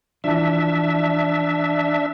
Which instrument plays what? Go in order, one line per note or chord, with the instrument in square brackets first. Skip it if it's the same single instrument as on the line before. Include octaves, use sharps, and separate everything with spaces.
[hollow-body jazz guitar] E3 F3 [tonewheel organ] D4 E5